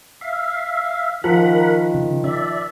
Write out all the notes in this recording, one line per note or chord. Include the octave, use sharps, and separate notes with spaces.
E5 F5
D#3 F3 A#4 F#5 B5
C#3
D5 E5